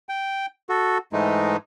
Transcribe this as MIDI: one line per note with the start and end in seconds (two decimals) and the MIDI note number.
0.09 0.46 79
0.69 0.98 66
0.69 0.98 69
1.13 1.57 44
1.13 1.57 52
1.13 1.57 56
1.13 1.57 57
1.13 1.57 63